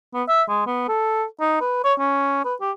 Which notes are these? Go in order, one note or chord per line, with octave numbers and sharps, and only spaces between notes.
B3
E5
G#3
B3
A4
D#4
B4
C#5
C#4
B4
G4